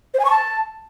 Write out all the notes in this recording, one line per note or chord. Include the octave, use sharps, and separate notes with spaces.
C5
G#5
C#6
A5